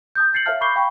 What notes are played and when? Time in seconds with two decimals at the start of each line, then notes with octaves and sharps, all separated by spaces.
0.15 A5 D#6 G6
0.33 G6 A6 C7 C#7 F#7
0.46 A#4 C#5 E5 F5 A5 F6
0.61 B5 C#6 D6 G6 C7 G7
0.75 F5 G5 B5 C#6